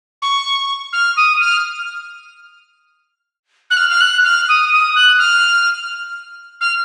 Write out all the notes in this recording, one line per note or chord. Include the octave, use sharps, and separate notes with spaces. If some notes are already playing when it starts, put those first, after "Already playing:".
C#6
F6
D#6
F6
F#6
F6
F6
F#6
F6
D#6
D#6
F#6
F6
F6